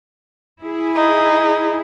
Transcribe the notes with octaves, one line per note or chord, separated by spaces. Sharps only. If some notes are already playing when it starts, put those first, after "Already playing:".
E4 G#4
D#4